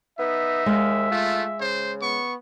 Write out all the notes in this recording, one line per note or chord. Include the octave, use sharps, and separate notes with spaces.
B3 D#4 E5
D#2 G#3 F5
A3 F4
C#3 C5
B3 C#6